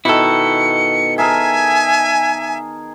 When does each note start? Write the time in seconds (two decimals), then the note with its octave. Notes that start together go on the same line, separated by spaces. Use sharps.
0.05 B2 D#3 E4 A4 C#7
1.18 G#4 A#4 E5 G#5 A5